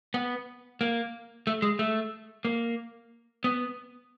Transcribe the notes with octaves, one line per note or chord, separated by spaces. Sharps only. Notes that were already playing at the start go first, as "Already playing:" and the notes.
B3
A#3
A3
G#3
A3
A#3
B3